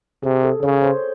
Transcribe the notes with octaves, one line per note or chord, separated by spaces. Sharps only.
C3 G#4
A4
C#3 C#5
C5